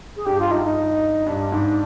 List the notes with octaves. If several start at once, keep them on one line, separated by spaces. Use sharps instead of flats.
G#4
G2 G4
F4
D#4
D#4
G2 D4
G#2